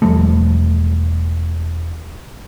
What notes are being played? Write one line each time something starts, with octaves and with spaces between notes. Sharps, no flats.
E1 F3 G3 A3